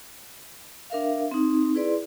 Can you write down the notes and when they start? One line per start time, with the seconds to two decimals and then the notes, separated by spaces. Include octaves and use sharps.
0.90 D4 A#4 E5 F5
1.31 C4 D#4
1.75 E4 G#4 B4 D5 C6